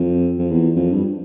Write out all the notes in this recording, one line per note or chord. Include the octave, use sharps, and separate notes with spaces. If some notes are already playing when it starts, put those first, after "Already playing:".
Already playing: F2
F2
E2
F2
G2